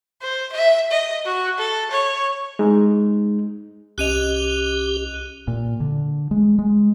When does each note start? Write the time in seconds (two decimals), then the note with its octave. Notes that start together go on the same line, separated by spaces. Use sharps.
0.22 C5
0.53 E5
0.91 D#5
1.25 F#4
1.58 A4
1.91 C#5
2.59 G#3 D#4
3.98 C2 C#4 G4 D#5 F#6 D#7 F7
5.48 A#2
5.80 D3
6.31 G#3
6.59 G#3